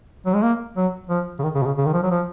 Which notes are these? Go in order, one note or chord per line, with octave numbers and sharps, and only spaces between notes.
F#3
G#3
A#3
F#3
F3
C#3
D#3
C#3
B2
C#3
C#3
D#3
F3
F#3
F3